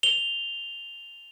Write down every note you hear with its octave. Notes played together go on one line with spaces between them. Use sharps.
F7 G7